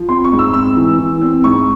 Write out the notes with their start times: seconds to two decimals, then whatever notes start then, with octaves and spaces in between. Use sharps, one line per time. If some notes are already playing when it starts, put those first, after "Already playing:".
Already playing: F3
0.09 C4 C6
0.24 C#6
0.32 G#2
0.39 E6
0.53 C4 E6
0.76 E3
0.99 E3
1.21 C4
1.44 G#2 C#6